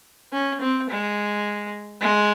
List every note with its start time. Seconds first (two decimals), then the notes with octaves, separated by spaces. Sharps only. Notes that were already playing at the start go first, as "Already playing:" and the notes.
0.33 C#4
0.61 C4
0.90 G#3
2.01 G#3